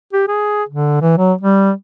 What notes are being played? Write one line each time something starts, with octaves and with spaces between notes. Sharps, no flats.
G4
G#4
D3
E3
F#3
G3